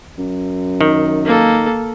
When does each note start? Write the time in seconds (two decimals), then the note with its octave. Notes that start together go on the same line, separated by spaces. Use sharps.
0.18 F#2
0.81 D#3
1.25 A#3 A4